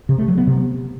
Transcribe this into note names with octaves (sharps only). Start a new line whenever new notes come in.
C3
A3
F#3
B3
C3